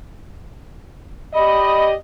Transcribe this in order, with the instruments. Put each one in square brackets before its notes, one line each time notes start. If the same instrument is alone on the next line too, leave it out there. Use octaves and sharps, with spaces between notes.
[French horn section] G4 D5 D#5 [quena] B5